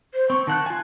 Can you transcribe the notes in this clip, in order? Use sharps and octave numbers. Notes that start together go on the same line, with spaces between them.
C5
C4 C#6
D#3 F#5 A5 F#6
F4 G#5